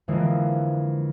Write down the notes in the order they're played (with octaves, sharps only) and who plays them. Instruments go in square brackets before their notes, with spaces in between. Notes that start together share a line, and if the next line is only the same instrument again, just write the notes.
[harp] F2 D3 E3 G#3 A#3